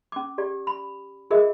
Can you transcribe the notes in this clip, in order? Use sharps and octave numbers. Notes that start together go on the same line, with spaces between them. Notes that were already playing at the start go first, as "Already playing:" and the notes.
C#4 D6
G4 D5
B5
F4 G#4 A#4 D#5 E5